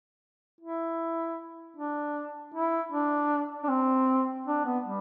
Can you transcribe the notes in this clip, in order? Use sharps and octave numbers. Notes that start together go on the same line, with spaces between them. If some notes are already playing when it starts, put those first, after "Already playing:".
E4
D4
E4
D4
D4
C4
D4
B3
G3